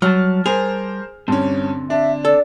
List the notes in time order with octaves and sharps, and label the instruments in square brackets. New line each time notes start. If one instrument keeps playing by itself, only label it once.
[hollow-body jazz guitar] F#3 [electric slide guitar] G3 A5 [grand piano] F6
[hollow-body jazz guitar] G#4 [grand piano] A#4 C5 F7
[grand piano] G2 C#4 [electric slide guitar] D3 C4
[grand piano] D4 [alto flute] E5
[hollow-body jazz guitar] A4 [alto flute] D5